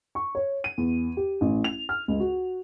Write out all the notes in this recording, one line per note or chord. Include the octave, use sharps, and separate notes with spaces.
C#6
C#5
D#7
E2
G4
A1
F7
F6
C#2
F#4